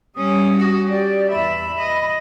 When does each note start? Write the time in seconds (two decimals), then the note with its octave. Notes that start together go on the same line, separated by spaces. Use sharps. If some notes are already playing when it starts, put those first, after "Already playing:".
0.16 G3 C#4 D#6
0.57 F#4
0.90 G4 D5
1.31 E2 E5 B5
1.80 D#5